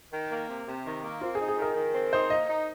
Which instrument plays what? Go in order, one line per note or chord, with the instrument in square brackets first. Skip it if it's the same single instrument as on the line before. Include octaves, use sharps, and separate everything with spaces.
[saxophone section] D#3
A#3
C3
C3
D#3
A#3
[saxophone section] C4 [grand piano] F4
[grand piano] G#4
[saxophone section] D#4
[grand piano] G#4
[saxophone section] D#3 [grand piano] A#4
[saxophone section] D#3
C4
[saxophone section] D#4 [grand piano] C5
[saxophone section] A#3 [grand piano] D#5
[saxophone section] D#4